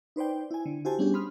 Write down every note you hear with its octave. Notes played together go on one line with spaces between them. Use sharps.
D#4 B4 C5 D5 G5
E4 G#5
D3
E4 F#4 G4 C5 G#5 A5
G3 B3 C#4 D4 G4 G#4
B5 C6 D#6 F6